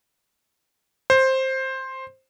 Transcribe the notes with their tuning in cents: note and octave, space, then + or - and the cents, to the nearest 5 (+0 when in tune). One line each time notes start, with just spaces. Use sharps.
C5 +10